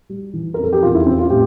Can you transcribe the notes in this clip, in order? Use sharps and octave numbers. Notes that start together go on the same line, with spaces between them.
G3
E3
A#4
F2 A4
G4
E2 F4
E4
E3 C4
F4
A2 G4